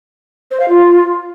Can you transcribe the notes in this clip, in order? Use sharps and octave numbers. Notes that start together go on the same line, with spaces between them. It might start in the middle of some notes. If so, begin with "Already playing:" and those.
C5
F5
F4